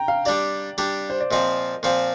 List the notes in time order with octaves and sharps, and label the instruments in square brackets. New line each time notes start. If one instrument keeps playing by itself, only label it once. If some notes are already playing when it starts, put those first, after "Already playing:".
Already playing: [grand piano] G5 A#5
F5
[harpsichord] G3 D4 G4 [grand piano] D5
[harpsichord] G3 D4 G4
[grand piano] C5
D5
[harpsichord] A#2 F3 C4 [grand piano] D#5
[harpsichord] A#2 F3 C4